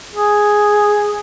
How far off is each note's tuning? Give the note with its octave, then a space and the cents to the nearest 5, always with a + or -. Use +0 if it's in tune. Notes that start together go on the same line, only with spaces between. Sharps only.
G#4 +0